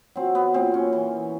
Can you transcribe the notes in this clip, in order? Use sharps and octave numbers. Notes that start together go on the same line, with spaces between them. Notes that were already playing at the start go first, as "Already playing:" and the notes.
F#3 C4
B3
A#2 C4
C#4
E3